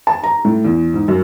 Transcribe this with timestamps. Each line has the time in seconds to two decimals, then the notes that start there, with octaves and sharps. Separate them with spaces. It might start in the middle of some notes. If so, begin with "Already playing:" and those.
0.07 A5
0.23 A#5
0.45 A2
0.64 E2
0.94 G#2
1.08 F#2